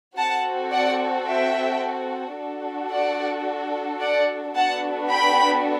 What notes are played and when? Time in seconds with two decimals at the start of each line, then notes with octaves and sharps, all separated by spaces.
0.17 C4 F#4 A4 F#5 A5
0.72 D5 F#5
1.27 E5 G5
2.37 D4 F#4 A4
2.91 D5 F#5
4.01 D5 F#5
4.55 B3 D4 F#4 A4 F#5 A5
5.10 G5 B5